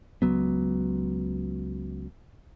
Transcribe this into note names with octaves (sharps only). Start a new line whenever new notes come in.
C#2 F#3 B3